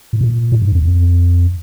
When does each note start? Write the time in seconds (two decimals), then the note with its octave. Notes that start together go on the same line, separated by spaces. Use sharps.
0.13 A2
0.21 A#2
0.52 A2
0.62 G2
0.72 E2
0.82 F2